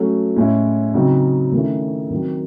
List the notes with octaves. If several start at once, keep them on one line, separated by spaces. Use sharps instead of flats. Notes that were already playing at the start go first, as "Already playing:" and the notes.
Already playing: F#3 A3 C#4
A2 G#3 C#4 E4
C#3 F#3 C4 D#4
D#3 A3 C#4 E4
D#3 F#3 C4